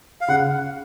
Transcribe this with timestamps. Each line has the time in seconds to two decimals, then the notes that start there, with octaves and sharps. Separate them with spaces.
0.21 F5
0.28 C#3 F#5